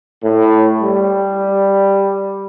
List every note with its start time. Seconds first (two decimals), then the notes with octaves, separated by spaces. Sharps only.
0.24 A2
0.82 G3